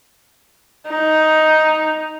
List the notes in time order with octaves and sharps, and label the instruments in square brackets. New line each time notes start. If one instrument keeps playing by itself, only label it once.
[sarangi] D#4